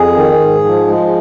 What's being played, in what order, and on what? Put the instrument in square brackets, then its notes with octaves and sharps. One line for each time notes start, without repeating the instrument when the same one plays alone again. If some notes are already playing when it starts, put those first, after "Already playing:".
Already playing: [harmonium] F2 G#4
D#3
G#2
F3
G#3